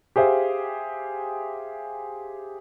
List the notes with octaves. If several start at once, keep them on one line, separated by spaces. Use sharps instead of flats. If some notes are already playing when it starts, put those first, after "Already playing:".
G4 G#4 C5 E5 F5